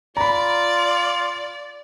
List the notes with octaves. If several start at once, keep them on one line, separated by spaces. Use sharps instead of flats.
F4 D5 A#5 B5